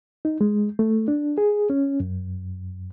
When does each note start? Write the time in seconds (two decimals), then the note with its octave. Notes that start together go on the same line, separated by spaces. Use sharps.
0.25 D#4
0.41 G#3
0.79 A3
1.08 D4
1.38 G#4
1.70 C#4
2.00 F#2